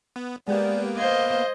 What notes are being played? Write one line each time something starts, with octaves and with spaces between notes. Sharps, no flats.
B3
G#3 A#3 B3 G4 D5
C5 D#5 F5 G#6